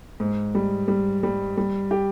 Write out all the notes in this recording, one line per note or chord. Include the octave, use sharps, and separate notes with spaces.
G#2
G3
G3
G3
G3
G4